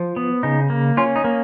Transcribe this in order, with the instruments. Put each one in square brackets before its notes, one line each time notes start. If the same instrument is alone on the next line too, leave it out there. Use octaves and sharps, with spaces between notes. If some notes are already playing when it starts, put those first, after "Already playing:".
Already playing: [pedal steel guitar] F3
B3
C#3 D#4
A#3
C#4 F4
D#4
A#3